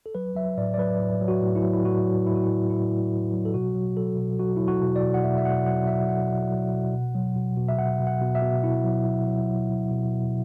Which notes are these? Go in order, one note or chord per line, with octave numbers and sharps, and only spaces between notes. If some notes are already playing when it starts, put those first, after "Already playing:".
A4
F#3 B4
F#3 E5
A2 D5
D5
F#3 B4
A2
F#3
F#4
A2
E4
F#3
E4
A2 F#4
F#3
A2 E4
F#4
F#3 E4
A2 E4
A2
A2
F#3
A4
B2 F#4
F#3
F#3 A4
B2
F#3 F#4
F#3 E4
F#4
B2
D5
B2
F#5
B2 E5
E5
B2 F#5
F#3 F#5
F#3 E5
F#3 F#5
B2
F#3
B2
B2
F#3
B2
B2
E5
B2 F#5
B2
F#5
B2
E5
B2
B2 E4
F#3
B2
F#3
F#3
B2
B2
B2